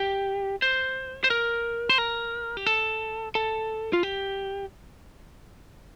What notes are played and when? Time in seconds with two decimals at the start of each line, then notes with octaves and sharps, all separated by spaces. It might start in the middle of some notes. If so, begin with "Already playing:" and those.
Already playing: G4
0.62 C5
1.24 C5
1.30 A#4
1.89 C5
1.98 A#4
2.57 G4
2.67 A4
3.35 A4
3.93 F4
4.03 G4